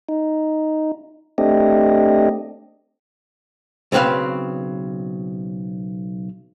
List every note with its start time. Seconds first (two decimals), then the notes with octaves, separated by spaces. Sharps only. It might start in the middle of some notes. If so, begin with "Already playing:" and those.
0.09 D#4
1.38 A3 C4 D4 G4 D#5
3.92 B1 C#3 C4 B4 F5